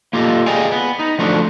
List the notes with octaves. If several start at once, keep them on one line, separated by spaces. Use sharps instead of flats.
A#3 F4 G4 A4 D#5
G#4 D5 D#5 F5 G5 G#5
B3
D#4
D3 F3 A3 C4 D4